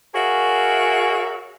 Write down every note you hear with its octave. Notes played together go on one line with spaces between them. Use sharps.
F#4 G#4 A#4 C#5 E5 F5